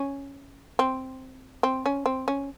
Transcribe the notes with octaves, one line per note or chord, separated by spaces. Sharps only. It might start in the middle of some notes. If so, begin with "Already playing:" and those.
Already playing: C#4
C4
C4
C#4
C4
C#4